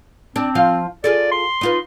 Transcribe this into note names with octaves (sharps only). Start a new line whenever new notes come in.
C4 D4
F3 F4 F5
F4 G#4 A4 D5
C6
D#4 F4 B4